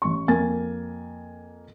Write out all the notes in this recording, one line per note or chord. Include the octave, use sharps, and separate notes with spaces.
A1 C#6
F2 A#3 A#4 G#5 A6